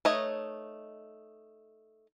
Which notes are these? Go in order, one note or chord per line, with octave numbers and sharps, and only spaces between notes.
A3 D#4 B4 C#5 D#5